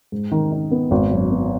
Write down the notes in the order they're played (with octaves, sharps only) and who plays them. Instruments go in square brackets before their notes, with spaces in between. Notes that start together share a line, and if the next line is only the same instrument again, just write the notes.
[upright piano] G#2
D#3
D#4
B3
G#1
F#2
B3